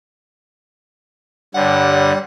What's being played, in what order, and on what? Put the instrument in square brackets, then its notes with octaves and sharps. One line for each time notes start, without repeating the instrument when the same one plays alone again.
[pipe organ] G2 D3 [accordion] G3 [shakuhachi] C#5 [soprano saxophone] F#5